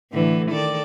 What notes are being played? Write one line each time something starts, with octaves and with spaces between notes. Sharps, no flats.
A2 D3 E3
D#3 A4 D5